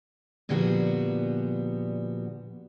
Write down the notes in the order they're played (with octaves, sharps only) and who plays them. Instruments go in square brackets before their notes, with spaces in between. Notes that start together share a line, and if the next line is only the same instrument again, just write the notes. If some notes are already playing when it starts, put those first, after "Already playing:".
[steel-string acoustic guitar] A#2 D3 F3 G3 B3 F#4